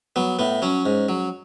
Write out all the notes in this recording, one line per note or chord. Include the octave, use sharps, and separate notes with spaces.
F#3 B3
A2 B3
F#3 C#4
G#2
F#3